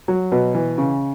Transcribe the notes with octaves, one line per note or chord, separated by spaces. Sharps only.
F#3
B2
E3
C#3